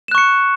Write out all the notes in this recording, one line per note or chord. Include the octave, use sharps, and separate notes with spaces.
C#6 F#6 C#7 E7